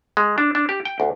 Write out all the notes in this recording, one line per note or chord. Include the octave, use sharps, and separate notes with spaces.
G#3
D4
D4
G4
G5
D2